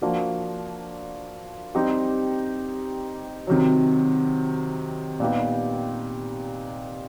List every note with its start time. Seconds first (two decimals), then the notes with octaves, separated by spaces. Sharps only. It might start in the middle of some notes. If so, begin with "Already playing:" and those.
0.02 F3 A#3 D4 F#4
1.75 G3 C4 D#4 G4
3.47 C3 D#3 F#3
5.20 A#2 G3 B3 D#4 G4